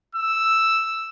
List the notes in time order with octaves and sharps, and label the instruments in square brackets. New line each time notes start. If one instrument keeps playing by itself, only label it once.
[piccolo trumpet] E6